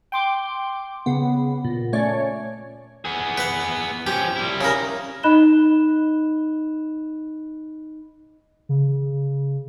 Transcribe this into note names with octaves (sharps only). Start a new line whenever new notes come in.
G5 C6 D6
C#3 B3
A#2
A3 C#4 C#5 D5
B3 G#4
B4 F#5
F3 C#4 G4
G3 E4
C#3 A#4
D#4 D#5 B5 F#6 E7 G7
C#3